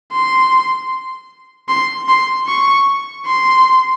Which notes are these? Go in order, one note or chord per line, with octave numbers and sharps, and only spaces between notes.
C6
C6
C6
C#6
C6